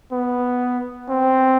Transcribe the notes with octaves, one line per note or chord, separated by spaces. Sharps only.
B3
C4